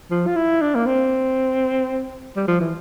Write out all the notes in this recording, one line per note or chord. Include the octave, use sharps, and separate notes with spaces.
F3
F4
E4
D4
A#3
C4
G3
F3
E3